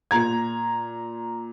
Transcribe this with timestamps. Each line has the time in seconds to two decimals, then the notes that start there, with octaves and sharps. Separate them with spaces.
0.11 A#2 A#5 G#6